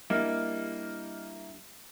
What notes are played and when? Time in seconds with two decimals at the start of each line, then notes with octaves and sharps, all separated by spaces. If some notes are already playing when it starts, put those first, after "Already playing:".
0.10 G3 A#3 D4 E4 D#5 F6